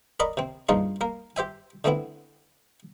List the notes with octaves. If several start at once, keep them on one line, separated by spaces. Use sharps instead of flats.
A#4 D5 D#5 B5 C#6
C3 C4
A#1 G2 F3 D#4 F4 G#4
A#3 A#4
G4 C5 E5 G#5
D3 A3 B3 C4 E4